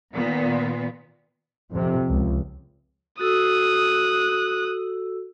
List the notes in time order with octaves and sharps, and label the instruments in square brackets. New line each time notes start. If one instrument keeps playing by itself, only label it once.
[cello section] A#2 D#3 B3
[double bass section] F2 C3
C#2
[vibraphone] F#4 A4 E6 [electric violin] D#6 F#6